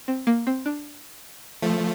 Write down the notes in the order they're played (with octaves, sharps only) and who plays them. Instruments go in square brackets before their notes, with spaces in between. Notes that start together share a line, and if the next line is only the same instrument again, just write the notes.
[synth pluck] C4
A#3
C4
D4
[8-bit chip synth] F3 A3